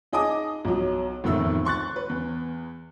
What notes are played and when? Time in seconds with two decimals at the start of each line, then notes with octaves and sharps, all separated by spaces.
0.13 D#4 G#4 D#5 A5 D6 D#6
0.65 B1 F#3
1.24 F1 E2 A2 D#3 A3 E6
1.65 C6 C#6 F#6 A6
1.96 B4
2.09 E2